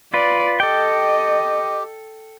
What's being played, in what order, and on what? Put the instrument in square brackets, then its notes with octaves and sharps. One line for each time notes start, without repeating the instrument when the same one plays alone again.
[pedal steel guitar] F4 B4 [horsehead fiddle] D5
[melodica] G4 [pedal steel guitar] A4 G5 [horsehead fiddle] D#5